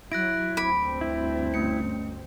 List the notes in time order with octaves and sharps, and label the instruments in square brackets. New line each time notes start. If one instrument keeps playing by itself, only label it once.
[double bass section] F#3 [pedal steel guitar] E4 [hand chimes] F#6 A#6 D7
[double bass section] D2 G2 C4 [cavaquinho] B5 [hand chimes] D6 D7
[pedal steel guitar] E4
[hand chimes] A3 C#4 C#7